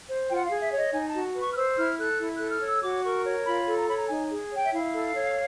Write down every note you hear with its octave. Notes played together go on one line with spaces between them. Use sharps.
C5
F4 G5
F#5
F5
G#4
E5
C#5
D#5
D#4 G#5
F#4 A5
B4
C#6
F6
C5 E6
E4 F6
A4 F#6
E4
A4 F#6
F6
C#5
E6
F#4 D6
A#4 C#6
C#5
F4 B5
A4
A#5
C#5 B5
A#5
D#4 G#5
G#4
C#5
G5
E5
E4 F5
A4
C#5